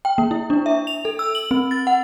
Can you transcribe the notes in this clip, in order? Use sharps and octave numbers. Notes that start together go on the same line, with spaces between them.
G5
A#3
E4
D4
E5
F7
A4
E6
F#7
C4
A6
F#5